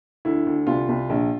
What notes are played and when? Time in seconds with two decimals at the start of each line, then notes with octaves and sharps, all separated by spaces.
0.25 D2 E4
0.46 D2
0.67 C2 F4
0.89 C2
1.10 A#1